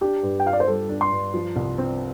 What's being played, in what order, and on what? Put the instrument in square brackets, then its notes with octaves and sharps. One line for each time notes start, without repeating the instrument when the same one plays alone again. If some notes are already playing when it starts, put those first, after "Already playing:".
[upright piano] D4 [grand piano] G4
[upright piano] G2
[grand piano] G5
[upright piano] F4 [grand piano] F5
[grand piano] D5
C5
[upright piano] G3 [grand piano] A4
[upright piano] D4
[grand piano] C6
[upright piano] G2
F3
C2
C4